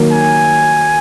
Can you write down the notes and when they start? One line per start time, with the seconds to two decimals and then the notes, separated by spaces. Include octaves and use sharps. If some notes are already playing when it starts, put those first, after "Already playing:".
Already playing: D#3 F#3 A#3
0.12 G#5